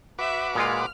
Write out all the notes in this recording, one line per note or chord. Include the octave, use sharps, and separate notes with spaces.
F#4 B4 E5 D6
A#2 G#3 F4 F6